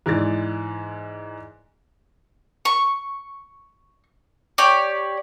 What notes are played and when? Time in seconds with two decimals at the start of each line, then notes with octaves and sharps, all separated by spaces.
0.06 G#2 E3 G#3 D5 A6
2.65 C#6
4.58 G4 C#5 D5